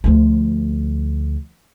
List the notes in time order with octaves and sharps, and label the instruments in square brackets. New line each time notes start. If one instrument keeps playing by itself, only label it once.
[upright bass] D2 F3